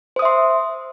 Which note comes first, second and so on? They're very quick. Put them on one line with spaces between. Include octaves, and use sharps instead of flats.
C5 D#6 E5 C6